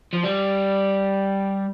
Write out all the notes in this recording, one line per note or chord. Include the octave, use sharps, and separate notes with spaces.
F3
G3